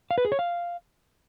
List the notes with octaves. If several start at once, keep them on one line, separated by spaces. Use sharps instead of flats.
F5
B4
G#4
C#5
F5